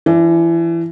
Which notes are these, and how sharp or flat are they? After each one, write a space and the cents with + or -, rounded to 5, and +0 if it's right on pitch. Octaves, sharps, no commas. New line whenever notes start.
E3 +25 D4 +0